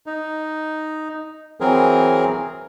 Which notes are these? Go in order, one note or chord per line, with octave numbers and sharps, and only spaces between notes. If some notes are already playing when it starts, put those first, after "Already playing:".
D#4
E3 F#3 C4 G#4 A#4